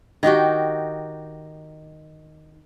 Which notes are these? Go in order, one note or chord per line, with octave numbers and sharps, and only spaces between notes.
D#3 D#4 F#4 G4